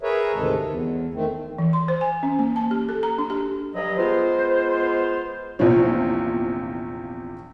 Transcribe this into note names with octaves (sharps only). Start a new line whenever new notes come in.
G#4 A#4 B4 C#5 E5
D2 G#2 C3 D#3 G#3 A4
E2
D#3 A3 C4
E3
C6
C5
G#5
C#4
A#3
A5
G4
A4
A#5
D4
G4
G2 F#3 D#5
G#3 B3 F4 C5
A#1 E2 C3 F3 C#5